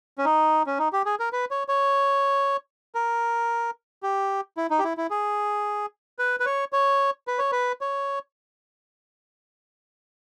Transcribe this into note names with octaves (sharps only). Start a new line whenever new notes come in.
C#4
D#4
C#4
D#4
G4
G#4
A#4
B4
C#5
C#5
A#4
G4
E4
D#4
G4
E4
E4
G#4
B4
B4
C#5
C#5
B4
C#5
B4
C#5